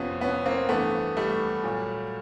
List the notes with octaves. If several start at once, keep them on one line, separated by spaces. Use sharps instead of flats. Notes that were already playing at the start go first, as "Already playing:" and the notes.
Already playing: F2 C3 F3 B3 C#4
B3 C#4
A#3 C4
G2 E3 A3 B3
G3 A3
A#2 F#3